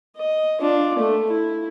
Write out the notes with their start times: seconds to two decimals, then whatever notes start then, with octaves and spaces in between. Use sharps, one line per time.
0.16 D#5
0.61 D4 F4
0.99 A3
1.28 E4